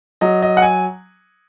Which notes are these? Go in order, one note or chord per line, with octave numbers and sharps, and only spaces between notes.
F#3 D#5
D#5
F#5
G#5